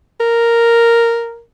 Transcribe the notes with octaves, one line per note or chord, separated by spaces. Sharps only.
A#4